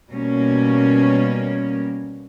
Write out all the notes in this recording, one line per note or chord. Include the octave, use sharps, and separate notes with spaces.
B2 G3 A#3 C#4